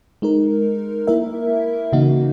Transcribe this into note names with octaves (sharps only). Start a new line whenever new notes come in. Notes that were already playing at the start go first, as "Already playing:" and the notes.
G#3 D#4 A#4
A#3 E4 A#4 E5
C#3 E3 A#3 D#4 F#4